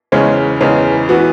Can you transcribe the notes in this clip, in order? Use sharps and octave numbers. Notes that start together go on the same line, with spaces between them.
E2 C#3 G#3 C#4
E2 C#3 G#3 C#4
E3 B3 F#4